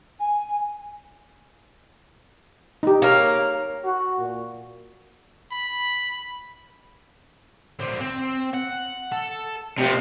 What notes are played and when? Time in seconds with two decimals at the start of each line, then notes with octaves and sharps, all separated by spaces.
0.19 G#5
2.83 D#4 G4
3.02 A#3 A#4 C#5
3.85 F#4
4.20 A#2
5.51 B5
7.79 D3 C4
8.00 C4
8.54 F#5
9.12 A4
9.78 D2 C3 F4 C5